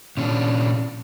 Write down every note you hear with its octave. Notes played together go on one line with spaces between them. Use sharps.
A#2 C#4 D4